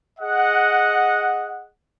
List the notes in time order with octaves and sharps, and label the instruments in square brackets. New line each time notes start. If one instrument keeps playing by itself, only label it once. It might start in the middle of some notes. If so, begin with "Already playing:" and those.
[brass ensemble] G#4 D#5 F#5